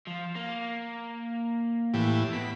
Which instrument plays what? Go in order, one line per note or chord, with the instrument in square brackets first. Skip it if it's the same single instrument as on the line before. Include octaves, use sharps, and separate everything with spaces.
[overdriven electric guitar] F3
A#3
[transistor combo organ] A2 E3 G4
[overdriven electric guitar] B2 [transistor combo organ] B5